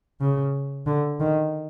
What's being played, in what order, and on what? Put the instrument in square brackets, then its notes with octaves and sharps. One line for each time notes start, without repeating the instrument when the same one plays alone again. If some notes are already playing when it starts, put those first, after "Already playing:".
[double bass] C#3
D3
D#3